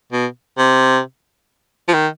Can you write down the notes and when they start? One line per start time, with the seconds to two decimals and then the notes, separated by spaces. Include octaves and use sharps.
0.12 B2
0.58 C3
1.88 F3
1.94 D#3